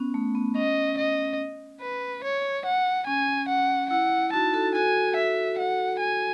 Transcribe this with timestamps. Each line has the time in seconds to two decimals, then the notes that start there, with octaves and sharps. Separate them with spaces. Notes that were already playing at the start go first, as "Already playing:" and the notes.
Already playing: B3 C#4
0.14 A3
0.35 B3
0.56 C#4 D#5
0.98 D#5
1.82 B4
2.24 C#5
2.66 F#5
3.07 C#4 G#5
3.49 F#5
3.91 E4 F#5
4.33 D#4 F#4 A5
4.54 F#4 A4
4.75 F#4 A4 G#5
5.16 E5
5.59 F#5
6.01 G#5